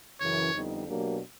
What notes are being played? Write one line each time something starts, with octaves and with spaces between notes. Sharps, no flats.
F#2 C#3 E3 C#5
F2 D3 G3 B3 D#4
B2 F#3 A#3 D4 G4